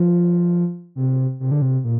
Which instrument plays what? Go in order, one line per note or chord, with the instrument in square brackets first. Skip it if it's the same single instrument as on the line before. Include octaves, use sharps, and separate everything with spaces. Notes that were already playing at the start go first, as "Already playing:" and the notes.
Already playing: [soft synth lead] F3
C3
C3
D3
C3
A#2